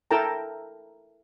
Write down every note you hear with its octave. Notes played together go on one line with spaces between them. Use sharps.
E4 A4 A#4 G5 A5 A#5